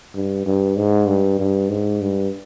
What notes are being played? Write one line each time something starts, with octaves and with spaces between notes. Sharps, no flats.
G2
G2
G#2
G2
G2
G#2
G2